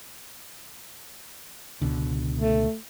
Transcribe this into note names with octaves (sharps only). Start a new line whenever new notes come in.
C#2 B2 D3
A3